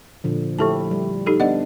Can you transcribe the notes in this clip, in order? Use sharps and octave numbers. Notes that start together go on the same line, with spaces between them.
A#2 D3 F3
F3 A3 E4 G4 A4 A5
G3
D#4 G4 A4
B3 D4 D5 D#5 F#5